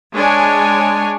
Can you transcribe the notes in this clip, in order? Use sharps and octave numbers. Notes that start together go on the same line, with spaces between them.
G#3 D4 C#5 G#5